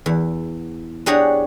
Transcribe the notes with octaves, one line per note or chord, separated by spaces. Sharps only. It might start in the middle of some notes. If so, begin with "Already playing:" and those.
E2
D4 G4 G#4 C#5 F#5 A#5